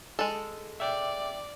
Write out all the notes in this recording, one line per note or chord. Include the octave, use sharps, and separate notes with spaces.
G#3 A4
D5 E5 G5